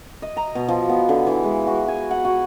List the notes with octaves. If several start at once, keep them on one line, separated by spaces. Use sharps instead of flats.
D#5
A#5
B2
F3
B3
D3
E3
G#3
F#4
G#5
F#5
F#4